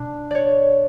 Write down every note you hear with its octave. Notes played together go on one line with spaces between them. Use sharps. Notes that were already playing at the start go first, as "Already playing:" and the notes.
Already playing: B2 D4
C#5 D5